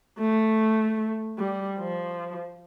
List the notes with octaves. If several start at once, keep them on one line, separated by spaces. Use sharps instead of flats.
A3
G3
F3